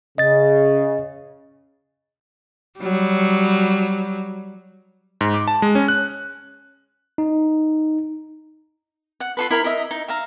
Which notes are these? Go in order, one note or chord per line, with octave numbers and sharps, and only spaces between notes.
C#3 D#5 A6
F#3 G3
G#2
D6
A5
G#3
C#4
F#6
D#4
F#5
F4 A4 B4
E4 A#4 G5 B5
A#4 D#5 E5
D#4
E5 F5 A#5